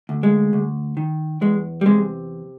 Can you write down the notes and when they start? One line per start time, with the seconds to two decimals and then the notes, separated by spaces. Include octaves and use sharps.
0.09 D2
0.23 G#3
0.53 D2
0.97 D#3
1.41 E2 G#3
1.81 G3
1.86 C3 G#3